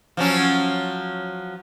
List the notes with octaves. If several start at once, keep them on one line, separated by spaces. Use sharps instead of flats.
F3 F#3 C#4